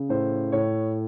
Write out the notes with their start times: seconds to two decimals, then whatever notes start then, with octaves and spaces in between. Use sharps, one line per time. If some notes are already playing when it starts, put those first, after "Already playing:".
Already playing: C#3
0.09 A2 C5
0.52 A2 C#5